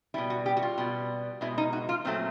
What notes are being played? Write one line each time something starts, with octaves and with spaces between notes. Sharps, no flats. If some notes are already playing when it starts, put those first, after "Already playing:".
B2 G3 E4
F#4
G4
F#4
F4
B2 G3
B2 G#3 E4
D#4
F#4
F4
A#2 F#3 A3 C4